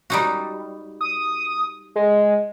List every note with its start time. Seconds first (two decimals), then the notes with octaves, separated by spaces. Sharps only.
0.10 G3 D#4 F#4
1.01 D#6
1.96 G#3